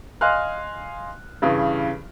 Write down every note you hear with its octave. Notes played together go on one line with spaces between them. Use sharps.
D#5 F5 G#5 C6 F6 F#6
G2 C#3 E3